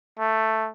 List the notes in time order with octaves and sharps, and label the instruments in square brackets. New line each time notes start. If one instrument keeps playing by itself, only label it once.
[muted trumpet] A3